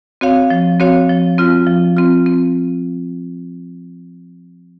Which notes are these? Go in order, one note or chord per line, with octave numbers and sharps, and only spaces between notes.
C4 F#4 C#5 F5
F3
C4 F#4 C#5 F5
F3
C4 F4
F3
C4 F4
C4